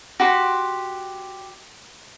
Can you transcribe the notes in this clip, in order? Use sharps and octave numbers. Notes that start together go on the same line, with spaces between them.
F#4 G4 C6